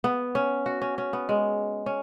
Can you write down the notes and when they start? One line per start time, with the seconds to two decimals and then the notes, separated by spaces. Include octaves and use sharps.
0.04 B3
0.35 C#4
0.66 F#4
0.82 C#4
0.98 C#4
1.13 B3
1.29 G#3
1.86 C#4